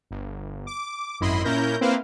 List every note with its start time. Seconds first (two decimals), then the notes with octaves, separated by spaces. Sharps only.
0.11 G1
0.67 D6
1.20 G#1 F#2 E4 D#5 B5 C6
1.44 A#2 C#4 E4 A#4 G6 A#6
1.81 A#3 C4 E4 B4 C5 F5